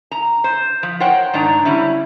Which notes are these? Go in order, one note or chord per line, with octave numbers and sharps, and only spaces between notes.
A#5
C5
F3
A#4 C5 C#5 F#5 G5
G#2 D#3 D4 A#5
D3 G3 C#4 E4